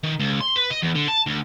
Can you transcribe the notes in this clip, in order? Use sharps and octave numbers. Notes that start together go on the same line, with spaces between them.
D#3
C#2
C6
B4
D#5
E2
D3
A5
D2